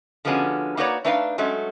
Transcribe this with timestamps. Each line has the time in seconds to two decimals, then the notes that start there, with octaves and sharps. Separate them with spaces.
0.25 D3 F3 G#3 B3 C#4 F#4
0.77 A#3 D#4 F#4 B4 C#5 D5
1.05 A3 D4 D#4 B4 E5 F5
1.38 F#3 G#3 A3 C#4